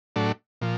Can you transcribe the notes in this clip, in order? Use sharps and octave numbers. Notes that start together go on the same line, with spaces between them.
A2 F#3 A3 D4
A#2 F3